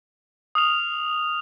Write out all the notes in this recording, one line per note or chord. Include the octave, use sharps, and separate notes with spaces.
D#6 F6 F7